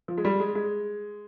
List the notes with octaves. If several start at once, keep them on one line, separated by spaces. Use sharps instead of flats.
F3
G#3
G3
G#3
G#3